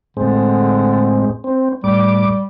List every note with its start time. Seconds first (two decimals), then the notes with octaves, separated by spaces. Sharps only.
0.17 A2 D3 G#3 C4
1.44 C4
1.84 A2 G3 D6